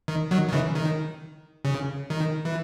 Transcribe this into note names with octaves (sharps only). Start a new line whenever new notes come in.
D#3
D#3 F#3
D#3
C#3 E3
D#3
C#3
D#3
E3